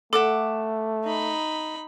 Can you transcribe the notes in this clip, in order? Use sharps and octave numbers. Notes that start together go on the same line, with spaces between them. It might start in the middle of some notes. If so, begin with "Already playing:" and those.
A3 A4 E5 F#5 D6
D#4 B5